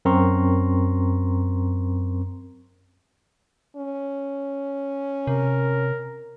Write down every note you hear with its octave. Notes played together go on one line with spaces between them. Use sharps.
F#2 C4 A#4 A#5 C6 C#6
C#4
C3 A#4